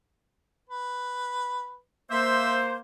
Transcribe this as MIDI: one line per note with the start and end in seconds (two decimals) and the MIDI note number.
0.70 1.78 71
2.11 2.77 58
2.11 2.77 72
2.11 2.57 76